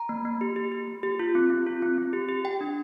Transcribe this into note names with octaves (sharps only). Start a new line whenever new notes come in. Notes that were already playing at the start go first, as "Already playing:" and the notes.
Already playing: A#5
A#3
A#3
G4
G4
G4
A#3
G4
F4
C4
C4
F4
C4
C4
G4
G4
G4 G5
D4